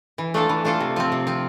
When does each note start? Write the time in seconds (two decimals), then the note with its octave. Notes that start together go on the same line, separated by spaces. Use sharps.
0.18 E3
0.34 A3 D4 F4 A4
0.49 E3
0.65 A3 D4 F4 A4
0.80 C3
0.96 F3 C4
1.12 C3
1.27 F3 C4